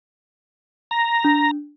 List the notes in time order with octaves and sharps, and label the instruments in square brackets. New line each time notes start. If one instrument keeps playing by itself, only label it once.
[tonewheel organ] A#5
[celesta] D4